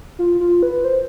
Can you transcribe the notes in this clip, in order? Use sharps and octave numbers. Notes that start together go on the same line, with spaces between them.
F4
F4
B4
C5